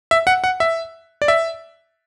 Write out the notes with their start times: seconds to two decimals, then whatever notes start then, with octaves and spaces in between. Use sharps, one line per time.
0.11 E5
0.27 F#5
0.44 F#5
0.60 E5
1.22 D5
1.28 E5